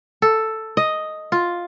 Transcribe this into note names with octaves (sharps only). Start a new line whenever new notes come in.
A4
D#5
F4